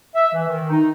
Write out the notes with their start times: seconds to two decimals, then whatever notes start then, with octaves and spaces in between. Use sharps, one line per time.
0.15 E5
0.33 E3
0.48 D#3
0.69 D#4